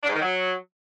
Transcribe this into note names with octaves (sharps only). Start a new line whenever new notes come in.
D4
G#2
D#3
F#3